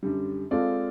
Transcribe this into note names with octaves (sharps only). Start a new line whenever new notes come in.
F#2 D3 G3
G#3 C4 F4 A4 D5